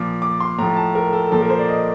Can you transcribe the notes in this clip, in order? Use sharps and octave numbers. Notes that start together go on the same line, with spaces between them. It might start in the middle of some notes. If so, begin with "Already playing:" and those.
Already playing: A#2 F3 D6
D6
C6
A2 F3 A#5
A5
A#4
A4
A#2 F3 A4
A#4
C5
D5
D#5